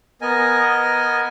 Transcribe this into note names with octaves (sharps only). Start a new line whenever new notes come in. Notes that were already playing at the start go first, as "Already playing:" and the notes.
B3 A#4 D#5 G#5